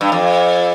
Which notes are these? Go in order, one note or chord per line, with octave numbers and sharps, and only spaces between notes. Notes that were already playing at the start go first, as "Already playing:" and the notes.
G2
F2